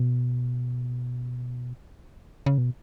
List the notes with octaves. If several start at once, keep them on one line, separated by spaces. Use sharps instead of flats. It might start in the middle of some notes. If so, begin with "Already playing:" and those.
Already playing: B2
C#3
B2